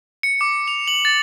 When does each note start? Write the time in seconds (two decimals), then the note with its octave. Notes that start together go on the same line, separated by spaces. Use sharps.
0.23 C#7
0.41 D6
0.68 F7
0.88 F#7
1.05 A6